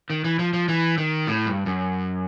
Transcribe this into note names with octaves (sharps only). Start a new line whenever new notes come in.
D#3
E3
F3
F3
E3
D#3
A2
G2
F#2